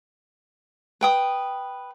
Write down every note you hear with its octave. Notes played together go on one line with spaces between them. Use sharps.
B4 G5 D#6